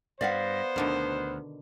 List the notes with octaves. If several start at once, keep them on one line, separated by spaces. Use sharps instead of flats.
G2 B3 C5 D5 F5 F#5
D2 B2 D3 D#3